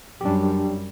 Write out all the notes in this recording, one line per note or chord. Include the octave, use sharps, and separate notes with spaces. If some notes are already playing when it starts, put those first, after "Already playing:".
F#2 G3 D4 G4